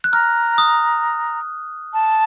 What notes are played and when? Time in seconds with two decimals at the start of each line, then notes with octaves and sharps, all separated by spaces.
0.04 F#6
0.13 A#5 F6
0.58 D#6
1.94 A5